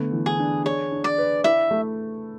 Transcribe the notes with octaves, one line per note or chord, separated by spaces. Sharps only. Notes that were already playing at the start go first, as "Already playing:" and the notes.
Already playing: D3 A3 B3
E3
G#4
D4
G#4 C#5
D4
D5
B4
E4 E5
A3